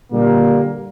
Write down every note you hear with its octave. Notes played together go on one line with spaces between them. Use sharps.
A#2 D3 G3 A#3